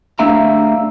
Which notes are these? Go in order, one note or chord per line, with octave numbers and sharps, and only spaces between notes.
G3 A3 D4 E5 F5 A#5